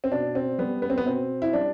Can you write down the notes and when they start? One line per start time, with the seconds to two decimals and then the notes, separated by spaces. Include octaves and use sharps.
0.04 C4
0.12 B2 D4
0.35 C4
0.58 G3 B3
0.82 B3
0.90 C4
0.98 B3
1.06 B2 C4
1.42 E4
1.53 G3 D4